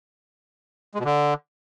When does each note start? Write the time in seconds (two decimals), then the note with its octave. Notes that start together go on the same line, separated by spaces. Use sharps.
0.95 G#3
1.00 B2
1.05 D3